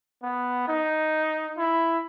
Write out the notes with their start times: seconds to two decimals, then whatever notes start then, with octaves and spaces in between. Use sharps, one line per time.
0.23 B3
0.68 D#4
1.58 E4